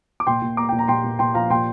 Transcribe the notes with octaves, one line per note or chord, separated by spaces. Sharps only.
D6
A#2 G5 C6
A#2
A#3 A#5 D6
A#2 G5
A#5
A#2 G5 C6
A#2
A#2 G5 C6
F3 F5 A#5
A#2 G5 C6